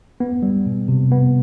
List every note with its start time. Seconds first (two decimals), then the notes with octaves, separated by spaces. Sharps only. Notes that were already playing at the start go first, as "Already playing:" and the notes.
0.20 B3
0.43 G3
0.66 B2
0.88 C3
1.11 B3